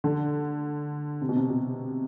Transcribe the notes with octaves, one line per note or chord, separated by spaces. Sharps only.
D3
C3
B2
C3
B2